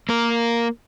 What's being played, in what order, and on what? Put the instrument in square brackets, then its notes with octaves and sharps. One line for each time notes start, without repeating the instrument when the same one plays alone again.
[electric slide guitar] A#3 A#4